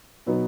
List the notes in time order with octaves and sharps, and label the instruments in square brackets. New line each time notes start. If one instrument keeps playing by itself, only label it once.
[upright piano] B2 F#3 B3 D#4